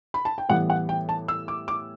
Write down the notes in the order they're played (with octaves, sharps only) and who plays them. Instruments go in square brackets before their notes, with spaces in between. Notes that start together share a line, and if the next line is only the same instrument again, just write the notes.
[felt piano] B5
A5
G5
A2 E3 G3 B3 F#5
F#5
G5
A5
E6
D6
D6